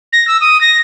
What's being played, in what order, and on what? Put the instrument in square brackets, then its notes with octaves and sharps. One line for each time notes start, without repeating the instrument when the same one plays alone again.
[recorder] A#6
E6
D#6
A#6